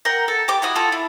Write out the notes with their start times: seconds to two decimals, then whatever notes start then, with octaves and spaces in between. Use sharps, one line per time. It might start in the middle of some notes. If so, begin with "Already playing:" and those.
0.05 A#4 F#5 G5
0.28 A4
0.48 G4 D6
0.62 E4 F#4 D#6
0.76 F4 A4
0.92 E4